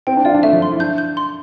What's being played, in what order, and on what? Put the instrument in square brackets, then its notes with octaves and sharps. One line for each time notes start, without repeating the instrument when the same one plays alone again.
[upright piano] C4 [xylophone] G5
[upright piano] D4
[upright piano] F4 [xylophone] D5
[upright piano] D4
[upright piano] A3 [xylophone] E5
[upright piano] F3
[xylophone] C6
[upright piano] E4
[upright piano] D4 [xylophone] G6
[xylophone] G6
C6